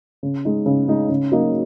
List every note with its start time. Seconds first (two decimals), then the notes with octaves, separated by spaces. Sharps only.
0.23 C#3
0.45 G#3 D#4
0.66 C#3
0.88 G#3 D#4
1.09 C#3
1.32 F#3 A#3 D#4